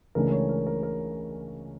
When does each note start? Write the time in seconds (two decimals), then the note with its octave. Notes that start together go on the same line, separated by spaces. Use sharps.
0.15 C#2 C#3 E3 A3 D4 A#4
0.32 C#5
0.49 A#4
0.67 A#4
0.83 A#4